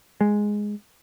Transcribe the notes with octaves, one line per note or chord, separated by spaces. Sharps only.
G#3